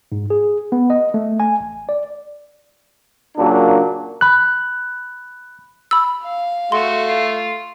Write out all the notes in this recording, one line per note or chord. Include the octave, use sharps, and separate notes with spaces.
G#2
G#4
B3
D#5
A3
G#5
A1
D5
A#2 C#3 F#3 A#3 D4
B5 F#6
B5 E6
F5
A3 F#4 C6
F4